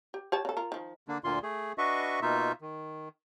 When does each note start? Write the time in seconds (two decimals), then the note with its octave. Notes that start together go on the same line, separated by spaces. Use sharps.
0.14 G4
0.32 G4 C#5 A5
0.45 C#3 A4
0.57 F4 A#4
0.72 D#3 F3
1.08 D3 A#3 D4
1.24 D2 A#2 D3 A#3 F4 C6
1.43 A3 G#4
1.78 D4 F#4 B4 D#5 E5 C#6
2.22 B2 A#3 D#4 F4 E5
2.61 D#3